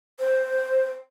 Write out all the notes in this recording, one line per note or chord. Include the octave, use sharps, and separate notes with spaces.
C5